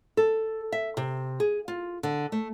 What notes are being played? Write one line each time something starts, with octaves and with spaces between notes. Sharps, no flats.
A4
E5
C3
G#4
F4
D3
A3